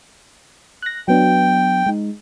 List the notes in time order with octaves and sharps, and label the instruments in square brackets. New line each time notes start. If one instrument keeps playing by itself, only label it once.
[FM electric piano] F#6 A#6
[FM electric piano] F#3 B3 D4 [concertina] G5
[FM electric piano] G#3 D#4